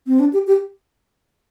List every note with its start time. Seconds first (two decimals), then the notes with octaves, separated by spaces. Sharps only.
0.07 C4
0.20 D4
0.33 G4
0.47 G4